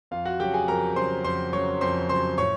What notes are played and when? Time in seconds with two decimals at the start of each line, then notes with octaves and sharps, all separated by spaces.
0.11 F2 F4 F5
0.25 F#4 F#5
0.40 C#3 F#3 G4 G5
0.54 G#4 G#5
0.68 F2 A#4 A#5
0.96 C#3 F#3 C5 C6
1.24 F2 C5 C6
1.53 C#3 F#3 C#5 C#6
1.81 F2 C5 C6
2.09 C#3 F#3 C5 C6
2.38 A2 C#5 C#6